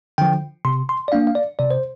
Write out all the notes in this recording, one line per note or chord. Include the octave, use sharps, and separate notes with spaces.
D3 F3 G5
C3 C6
C6
D5
A#3 D4 F5
F5
D5
C3 D5
C5